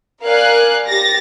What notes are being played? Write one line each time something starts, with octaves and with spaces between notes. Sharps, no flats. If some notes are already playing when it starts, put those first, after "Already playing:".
A#4 D5 F5 G#5 F#6
G4 A6 A#6